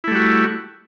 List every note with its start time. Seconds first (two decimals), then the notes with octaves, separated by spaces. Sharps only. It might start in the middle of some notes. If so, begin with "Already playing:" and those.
0.04 E4
0.08 A3
0.11 G3
0.15 F#4